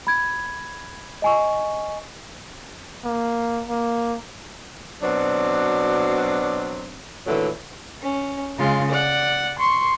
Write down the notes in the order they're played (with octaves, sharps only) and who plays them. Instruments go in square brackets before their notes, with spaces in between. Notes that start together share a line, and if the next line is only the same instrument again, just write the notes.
[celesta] B5 G#6
D#5 G#5 C#6
[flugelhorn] A#3
A#3
[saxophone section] B2 F#3 C4 D4
A#2 D3 E3 F#3 A3
[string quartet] C#4
C#3 G#3 F4
D5 F#5
C6 C#6